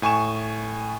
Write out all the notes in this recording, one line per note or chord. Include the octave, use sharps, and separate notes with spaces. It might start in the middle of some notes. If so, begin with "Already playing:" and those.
A2 G#5 C#6 E7